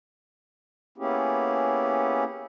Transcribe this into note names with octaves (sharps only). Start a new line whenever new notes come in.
A#3 B3 C#4 E4 G4 G#4